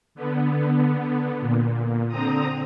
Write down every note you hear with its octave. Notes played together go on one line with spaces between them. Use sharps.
D3 B3
A#2
D3 C4 A#5 D#6